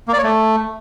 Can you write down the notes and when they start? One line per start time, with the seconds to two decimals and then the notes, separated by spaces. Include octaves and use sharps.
0.08 A#3
0.13 D5
0.18 C#5
0.24 A3